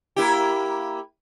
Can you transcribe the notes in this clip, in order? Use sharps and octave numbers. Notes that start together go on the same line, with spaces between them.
A#3 E4 G4